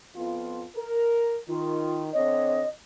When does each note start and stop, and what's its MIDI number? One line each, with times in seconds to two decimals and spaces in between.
0.15 0.62 41
0.15 0.62 59
0.15 0.62 65
0.76 1.37 70
1.48 2.10 51
1.48 2.03 65
2.13 2.63 50
2.13 2.63 60
2.13 2.63 73
2.13 2.68 75